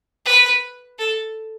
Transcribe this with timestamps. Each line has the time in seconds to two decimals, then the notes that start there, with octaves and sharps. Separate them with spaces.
0.25 B4
0.99 A4